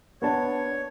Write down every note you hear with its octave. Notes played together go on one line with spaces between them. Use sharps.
B3 D4 C#5 A5